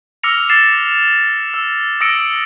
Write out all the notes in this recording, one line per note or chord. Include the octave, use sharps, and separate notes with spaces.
D6 E6 F6 A#6 C#7 F7
D6 A6 C7 E7
E6
D#6 E6 A#6 C#7 D7